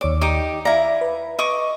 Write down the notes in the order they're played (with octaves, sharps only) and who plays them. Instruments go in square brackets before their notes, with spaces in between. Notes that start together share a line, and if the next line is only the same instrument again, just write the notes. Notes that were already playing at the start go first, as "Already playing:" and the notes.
[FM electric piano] D#2 C#5 D5 [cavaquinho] D6
[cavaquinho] D#4 G4 D6
[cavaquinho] E4 A#5 [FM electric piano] D5 F5
[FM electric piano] B4
[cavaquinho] D#5 C#6 D6